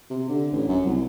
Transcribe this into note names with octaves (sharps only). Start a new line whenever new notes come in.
C3
D3
A1
F#2
C2